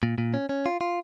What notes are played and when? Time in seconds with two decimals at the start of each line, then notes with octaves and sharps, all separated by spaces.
0.03 A#2
0.18 A#2
0.34 C#4
0.49 C#4
0.66 F4
0.81 F4